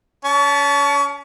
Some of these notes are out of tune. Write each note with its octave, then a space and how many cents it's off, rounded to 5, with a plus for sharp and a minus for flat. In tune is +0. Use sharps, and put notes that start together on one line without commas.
C#4 +30 A5 -20 C#6 +30